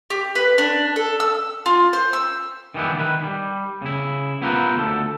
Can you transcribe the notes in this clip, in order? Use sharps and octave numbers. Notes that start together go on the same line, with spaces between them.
G4
B4
D4
A4
E6
F4
C5
E6
D#3 E3 G3 B3 E4
D#3 B4
G3
C#3 E4
B3 E4 F4 G4 A#4 B4
D2 A4